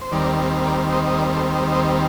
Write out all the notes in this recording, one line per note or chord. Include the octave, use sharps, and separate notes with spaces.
C5
D#2 D#3 G3 C4 A#4 D5
A#4 D5
C5 D#5
D#5
A#4 D5
A4 C5
C5 D#5
C5 D#5